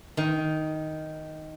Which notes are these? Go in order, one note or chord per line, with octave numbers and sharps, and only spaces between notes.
D#3